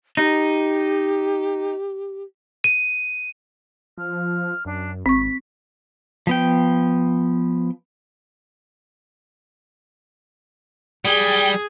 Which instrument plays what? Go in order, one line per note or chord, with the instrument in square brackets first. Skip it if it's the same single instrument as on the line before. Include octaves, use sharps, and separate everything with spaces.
[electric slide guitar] D#4 [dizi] G4
[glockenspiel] D#7
[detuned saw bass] F3 [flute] F6
[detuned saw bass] F#2 [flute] D4
[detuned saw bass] G#1 [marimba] C4 C#6 [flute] B6
[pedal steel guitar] F3 B3 G5
[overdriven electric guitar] G3 [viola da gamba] G#4 [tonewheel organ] G5